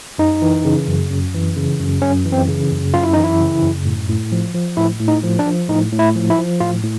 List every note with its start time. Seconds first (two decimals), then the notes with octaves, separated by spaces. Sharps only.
0.18 F#2 D#4
0.42 E3
0.65 C#3
0.88 F#2
1.10 F#2
1.34 E3
1.57 C#3
1.79 F#2
2.02 F#2 C#4
2.25 E3
2.32 C4
2.48 C#3
2.71 F#2
2.94 F#2 F4
3.03 E4
3.13 E3 D#4
3.24 E4
3.40 C#3
3.62 F#2
3.86 A2
4.09 A2
4.32 F3
4.54 F3
4.77 A2 E4
5.00 A2
5.08 D#4
5.23 F3
5.39 D4
5.46 F3
5.69 A2 D#4
5.92 A2
5.99 E4
6.15 F3
6.30 E4
6.38 F3
6.60 A2 F4
6.83 A2